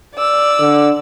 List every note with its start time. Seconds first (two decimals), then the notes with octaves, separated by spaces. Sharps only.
0.15 D5 E6
0.60 D3